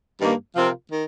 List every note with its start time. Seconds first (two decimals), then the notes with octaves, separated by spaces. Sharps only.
0.21 G2 D#3 A#3
0.56 C3 F3 C4 F4 A#4
0.91 D#3